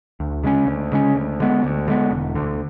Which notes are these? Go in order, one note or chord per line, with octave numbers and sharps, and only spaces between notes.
D2
C#3 G#3 C#4
D2
C#3 G#3 C#4
D2
D3 G#3 B3
D2
D3 G#3 B3
E1
D2 D3